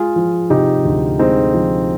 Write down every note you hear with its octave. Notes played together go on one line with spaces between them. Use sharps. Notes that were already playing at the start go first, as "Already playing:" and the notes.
Already playing: G#3 F4 G#4
F3
C3 D#4 G4
D2
G#3 C4 D#4
F3